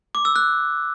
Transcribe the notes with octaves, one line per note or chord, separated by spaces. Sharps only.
D6
E6
F#6